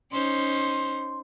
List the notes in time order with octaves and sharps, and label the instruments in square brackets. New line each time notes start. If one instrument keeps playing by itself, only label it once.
[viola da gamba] C#4 D#4 C5 [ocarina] C6